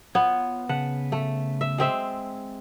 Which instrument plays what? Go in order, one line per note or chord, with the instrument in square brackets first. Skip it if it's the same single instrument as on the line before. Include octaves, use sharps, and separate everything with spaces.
[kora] B3 [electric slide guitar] F4 B4 C#5
[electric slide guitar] C#3 B4 A5 [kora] F#5
[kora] A3
E5
G#3 C4 E5